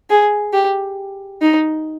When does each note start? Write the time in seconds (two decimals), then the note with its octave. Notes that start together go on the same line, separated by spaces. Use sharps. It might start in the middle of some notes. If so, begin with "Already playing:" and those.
0.10 G#4
0.53 G4
1.42 D#4